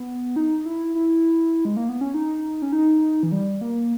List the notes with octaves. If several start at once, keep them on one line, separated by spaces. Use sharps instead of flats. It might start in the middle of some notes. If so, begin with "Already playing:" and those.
Already playing: B3
D#4
E4
E4
G#3
A#3
B3
C#4
D#4
C#4
D#4
E3
G3
A#3